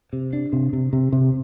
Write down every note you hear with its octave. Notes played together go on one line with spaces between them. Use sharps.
C3
D4
C3
C3
C3
C3